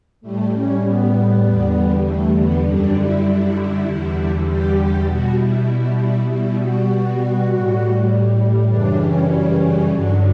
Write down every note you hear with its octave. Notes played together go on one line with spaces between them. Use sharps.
A2 G3 A3
C#4
B3
E2 D3 G3
A3
B3
F#2 D3 G3 D4
E4
E2 D3 G3
G4
G4
B2 G3 F#4
E4
E4
E4
B2 G3 E4
F#4
A2 G3
F#2 C#3 E3 G3 D4
C#4
C#4
C#4
G2 D3 F#3 D4